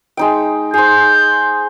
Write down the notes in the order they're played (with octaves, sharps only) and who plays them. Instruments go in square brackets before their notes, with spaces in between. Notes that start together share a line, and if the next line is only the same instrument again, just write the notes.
[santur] G#3 D#4 G5
[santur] G#4 C5 [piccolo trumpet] G6